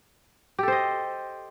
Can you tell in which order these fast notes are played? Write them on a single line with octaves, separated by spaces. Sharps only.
G4 A4 C5 D#5